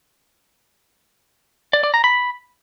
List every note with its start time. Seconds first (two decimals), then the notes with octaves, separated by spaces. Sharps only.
1.73 D5
1.84 D5
1.94 A#5
2.04 B5